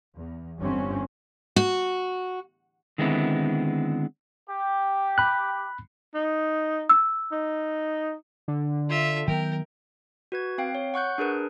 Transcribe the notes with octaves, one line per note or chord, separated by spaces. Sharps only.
E2
G1 G2 D3 E3 C4 C#4
F#4
D3 D#3 G#3 B3 C4 E4
G4
B5 F#6
D#4
E6
D#4
D3
F4 E5
D#3 F#3 B3 A#4 G5
F#4 B4 G#6
C4 F5 G5
C#5
F#5 C#6 F#6 G6
D4 G#4 A#4 B4